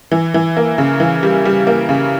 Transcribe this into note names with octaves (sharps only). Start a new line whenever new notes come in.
E3
E3
A#3
C#3
E3
G3
G3
A#3
C#3